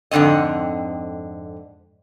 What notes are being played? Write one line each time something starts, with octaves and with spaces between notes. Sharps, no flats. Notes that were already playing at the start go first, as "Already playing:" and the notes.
F2 G#2 D3 C4 D#5